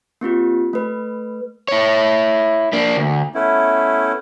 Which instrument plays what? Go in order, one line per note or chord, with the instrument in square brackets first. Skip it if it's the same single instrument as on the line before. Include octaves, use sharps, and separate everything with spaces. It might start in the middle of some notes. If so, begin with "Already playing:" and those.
[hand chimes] A#3 C4 F4 G4
A3 B4
[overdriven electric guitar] E4 C#5
A#3 D4
D2
[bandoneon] A3 B3 C#4 E4